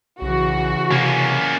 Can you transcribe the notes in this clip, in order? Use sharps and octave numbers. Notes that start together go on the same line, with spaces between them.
B1 C#3 E3 F#4
C3 A#3 C#4